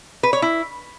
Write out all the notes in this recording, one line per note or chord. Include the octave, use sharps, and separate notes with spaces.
B4
C#5
E4